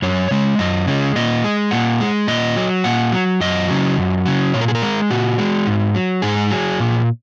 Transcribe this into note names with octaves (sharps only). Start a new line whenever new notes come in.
F#2 C#5
C#3 G#3
F#2 D#5
C#3 G#3
A#2 D#5
G#3
A#2 F#5
G#3
A#2 D#5
F#3
A#2 F#5
F#3
F#2 D#5
C#3 F#3
F#2
C#3 F#3
A#2 C#5
A#4
G#4
A#4
G#3
A#2 F#4
G#3
G#2
F#3
G#2 G#4
F#3
A#2